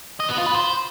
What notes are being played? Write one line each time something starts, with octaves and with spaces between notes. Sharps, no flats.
D#5
B3
F4
B4
C5